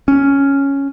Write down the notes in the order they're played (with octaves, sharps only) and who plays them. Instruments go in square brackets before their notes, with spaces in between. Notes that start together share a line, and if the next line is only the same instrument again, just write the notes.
[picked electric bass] C#4